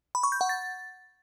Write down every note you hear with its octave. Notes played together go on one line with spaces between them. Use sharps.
B5
C#6
G6
F#5
A6